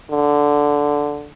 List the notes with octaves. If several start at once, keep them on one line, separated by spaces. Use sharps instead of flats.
D3